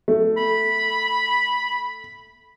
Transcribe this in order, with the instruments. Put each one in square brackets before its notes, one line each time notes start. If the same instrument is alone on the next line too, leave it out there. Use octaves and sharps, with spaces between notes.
[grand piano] A3
[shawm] B5